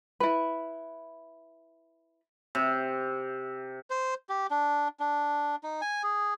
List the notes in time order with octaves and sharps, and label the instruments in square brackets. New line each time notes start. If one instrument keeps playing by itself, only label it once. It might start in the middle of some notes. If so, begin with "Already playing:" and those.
[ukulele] E4 B4
[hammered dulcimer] C3
[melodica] C5
G4
D4
D4
D#4
G#5
G#4